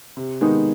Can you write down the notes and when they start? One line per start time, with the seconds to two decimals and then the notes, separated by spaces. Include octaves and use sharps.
0.17 C3
0.41 D#3 G#3 B3 D#4